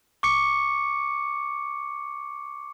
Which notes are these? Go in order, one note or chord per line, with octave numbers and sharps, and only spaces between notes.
C#6 D6 C#7